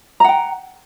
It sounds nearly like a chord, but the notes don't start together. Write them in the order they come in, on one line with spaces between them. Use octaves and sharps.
A#5 F#5 G5